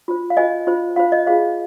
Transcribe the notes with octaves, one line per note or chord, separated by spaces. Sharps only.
F4 C5
F5
F4 C5 D#5 G#5
F4 C5
F4 C5 F5
D#5
F4 G#4 C5 F5